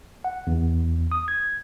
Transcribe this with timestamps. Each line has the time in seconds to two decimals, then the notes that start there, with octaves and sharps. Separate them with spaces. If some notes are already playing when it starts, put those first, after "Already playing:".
0.24 F#5
0.47 E2
1.12 D#6
1.28 G#6